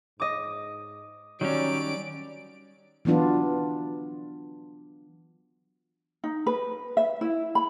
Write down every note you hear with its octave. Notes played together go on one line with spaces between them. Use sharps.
G#2 D#5 D6
D#3 F#3 G3 C#4 D5 D7
E3 F#3 B3 D4 F4
D#4
B4
E5
E4
B5